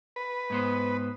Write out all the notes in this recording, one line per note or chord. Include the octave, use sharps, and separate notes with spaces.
B4
G#2 B3 C5